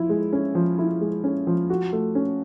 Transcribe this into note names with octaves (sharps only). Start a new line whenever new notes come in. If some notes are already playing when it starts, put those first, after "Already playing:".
Already playing: F3 E4
G#3
C#4
F3
E4
G#3
C#4
F3
F#4
A3
C#4